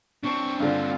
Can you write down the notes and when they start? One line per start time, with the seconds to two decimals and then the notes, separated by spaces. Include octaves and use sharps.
0.24 C4 D4 C#6
0.60 G2 D3 F4